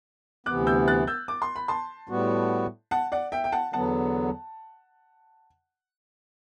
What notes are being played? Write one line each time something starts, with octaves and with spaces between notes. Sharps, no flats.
D2 C3 E3 B3 D6 F#6
E6 G6
F#6 A6
E6 G6
D6
C6
B5
A5 C6
A2 G3 B3 F#4
F#5 A5
D5 F#5
E5 G5
G5
F#5 A5
E2 D3 F#3 B3 F#5 A5